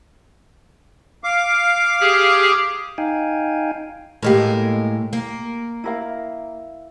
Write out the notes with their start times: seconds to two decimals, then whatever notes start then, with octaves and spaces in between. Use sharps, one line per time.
1.24 F5 D6
2.00 G4 G#4
2.98 D#4 F5 G5 G#5
4.23 A2 G#3 A#3 G4 A#4
5.13 A#3
5.84 E4 A#4 F5